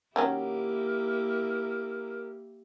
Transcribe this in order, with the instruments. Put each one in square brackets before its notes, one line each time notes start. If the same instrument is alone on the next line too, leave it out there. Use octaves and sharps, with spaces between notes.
[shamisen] D#3 F#3 C#4 [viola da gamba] A#3 E4 G4 [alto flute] A#4